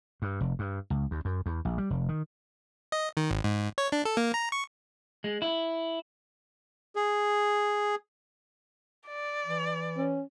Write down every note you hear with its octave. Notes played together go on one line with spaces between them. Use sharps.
G2
F1
G2
C#2
D#2
F#2
E2
A#1
G3
F1
D#3
D#5
D#3
G#1
G#2
C#5
D4
A4
A#3
A#5
C#6
G#3
E4
G#4
D5
E3
C#4